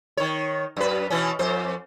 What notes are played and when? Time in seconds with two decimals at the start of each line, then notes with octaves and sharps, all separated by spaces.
0.17 D#3 C#5
0.77 F#2 B4
1.10 B2 E3 C#4
1.39 F2 C5